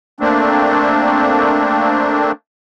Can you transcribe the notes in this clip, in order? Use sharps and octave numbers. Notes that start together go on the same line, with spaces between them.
A3 A#3 C4 D4